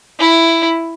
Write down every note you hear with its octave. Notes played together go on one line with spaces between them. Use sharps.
E4